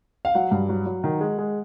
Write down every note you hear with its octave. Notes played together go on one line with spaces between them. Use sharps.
F5
F#3 F#5
G2
F#3
F#3
D#3
G#3
G#3